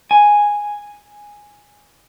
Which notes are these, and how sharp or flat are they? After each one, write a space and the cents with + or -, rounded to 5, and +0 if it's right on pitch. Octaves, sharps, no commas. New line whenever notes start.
G#5 -5